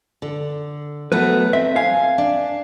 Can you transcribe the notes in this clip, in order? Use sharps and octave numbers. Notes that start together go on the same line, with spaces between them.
D3
F#3 A3 B3 B4
C4 E5
F5 G#5
D4